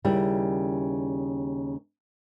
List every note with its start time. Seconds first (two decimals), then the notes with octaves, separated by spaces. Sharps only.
0.04 D#2 C#3 G3 E4